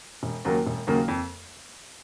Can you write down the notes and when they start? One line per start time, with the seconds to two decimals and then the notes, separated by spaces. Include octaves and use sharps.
0.23 E1
0.45 D#2 C#3 F#3 A#3
0.66 E1
0.87 D#2 C#3 F#3 A#3
1.08 F2